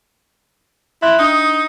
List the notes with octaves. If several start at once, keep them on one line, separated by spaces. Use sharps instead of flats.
E4 E5 C6 F#6
D4 D#4 D#6